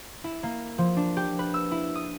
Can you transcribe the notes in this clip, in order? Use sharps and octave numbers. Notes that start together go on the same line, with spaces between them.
E4
A#3
F3
D4
G4
B4
E6
E4
D#6